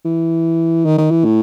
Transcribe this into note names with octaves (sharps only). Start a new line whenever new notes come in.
E3
D#3
D#3
E3
A2